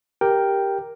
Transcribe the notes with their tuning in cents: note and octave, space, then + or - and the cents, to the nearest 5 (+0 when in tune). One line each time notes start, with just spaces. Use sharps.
G4 +0 A#4 +0 G5 +0